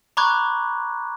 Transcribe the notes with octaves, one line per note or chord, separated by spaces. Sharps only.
A#5 B5 C#6 D6 F#6 G#6